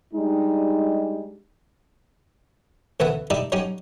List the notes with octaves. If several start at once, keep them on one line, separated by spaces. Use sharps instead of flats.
G3 G#3 D4 D#4
A1 D2 E3 B3 F#5
D#4 E4 G4 D5
F#3 C#4 D#4 G4